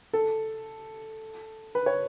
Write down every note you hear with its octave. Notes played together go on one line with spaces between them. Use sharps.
A4
B4
C#5